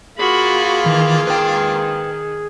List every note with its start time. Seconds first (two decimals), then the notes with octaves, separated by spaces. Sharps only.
0.18 A#3 F4 F#4 G#4 B5
0.86 D#3 E3
1.27 D#3 B4 G5